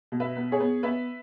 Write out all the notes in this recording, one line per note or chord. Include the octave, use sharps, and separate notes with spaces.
B2
B4 E5
B3
G#4 C#5
B3
B3 B4 E5